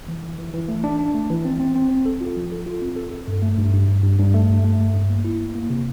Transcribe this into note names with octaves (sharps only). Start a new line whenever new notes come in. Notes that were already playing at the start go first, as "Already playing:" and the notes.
E3
E3
E3
E3
A3
D4
D4
A3
E3
C4
C4
C4
C4
A4
F4
F3
A4
F4
C4
A4
A4
G2
A3
G2
G2
G2
G2
G2
A3
G2
A3
G2
G2
A#3
E4
A#3
A#3
C3